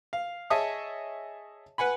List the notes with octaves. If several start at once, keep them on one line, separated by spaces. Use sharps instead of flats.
F5
G#4 C#5 D#5 E5 A5 D#6
B4 F#5 G#5 B5